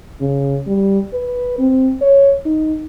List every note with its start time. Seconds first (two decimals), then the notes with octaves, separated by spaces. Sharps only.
0.21 C#3
0.67 G3
1.14 B4
1.59 C4
2.02 C#5
2.46 D#4